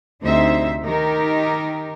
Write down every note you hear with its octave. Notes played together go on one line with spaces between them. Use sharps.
D2 C3 D#4 C5 E5
D#3 D#4 G4 A#4